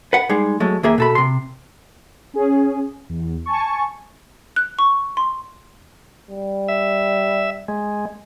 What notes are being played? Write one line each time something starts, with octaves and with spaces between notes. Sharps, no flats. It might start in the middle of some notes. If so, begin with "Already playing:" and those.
B4 F#5
G3 G#3 D#4 G#4
F#3 G#3 A3
D#2 A#3 G#4 E5
B2 A4 B5
C3 C6
C#4 G#4
E2
G#5 A5 C#6
F#6
C#6
C6
G3
E5
G#3